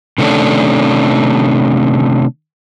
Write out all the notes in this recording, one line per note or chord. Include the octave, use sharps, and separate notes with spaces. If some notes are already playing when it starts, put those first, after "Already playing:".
C3 D#3 A3 C#4 D4